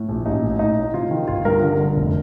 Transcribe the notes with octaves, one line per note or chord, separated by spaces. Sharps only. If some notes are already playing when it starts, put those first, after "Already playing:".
Already playing: A2
A#1
A1 D#4
A2
A2 D#4
A2
C3 F4
D#3
G1 F4
G2 A#4
D3 A#4
D3
F1